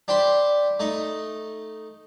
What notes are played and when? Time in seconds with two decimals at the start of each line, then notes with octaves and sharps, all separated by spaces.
0.08 D4 G4 C5 B5 C6
0.80 A3 D#4